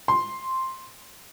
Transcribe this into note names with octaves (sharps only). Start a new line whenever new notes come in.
C6